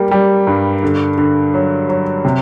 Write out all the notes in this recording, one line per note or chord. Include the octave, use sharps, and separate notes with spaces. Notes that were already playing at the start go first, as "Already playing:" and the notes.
Already playing: G3 A#3
G3
G2
D3
D3
F#3
F#3
C3